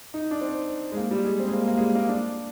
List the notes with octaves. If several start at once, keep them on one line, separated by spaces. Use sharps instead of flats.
D#4
D4
C4
G#3
A#3
G3
G#3
C4
G#3
A#3
A#3
G#3
G3
A#3
D4